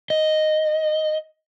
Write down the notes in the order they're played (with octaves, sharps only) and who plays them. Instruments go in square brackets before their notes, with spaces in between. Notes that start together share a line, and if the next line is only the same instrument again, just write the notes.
[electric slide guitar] D#5